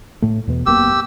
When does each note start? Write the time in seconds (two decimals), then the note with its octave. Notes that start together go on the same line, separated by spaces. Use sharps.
0.22 A2 A3
0.47 E2 B2 B3
0.66 F#1 A#3 B3 G4 E6